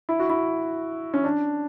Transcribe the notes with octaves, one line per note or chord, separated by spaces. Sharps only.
E4
F#4
E4
C#4
D4